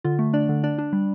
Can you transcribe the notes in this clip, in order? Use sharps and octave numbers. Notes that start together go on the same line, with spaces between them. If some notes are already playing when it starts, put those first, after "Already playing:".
D3 F4
A3
D4 D5
D3
D4 D5
D4
G3